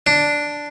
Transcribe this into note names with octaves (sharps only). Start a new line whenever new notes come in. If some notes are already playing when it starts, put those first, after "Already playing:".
D4